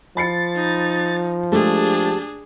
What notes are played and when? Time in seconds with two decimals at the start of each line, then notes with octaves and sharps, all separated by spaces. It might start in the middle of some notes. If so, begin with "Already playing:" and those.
0.17 F3 B5 A6 C7 C#7
0.56 D#4
1.52 G#3 A3 D4 G4 G#4 A5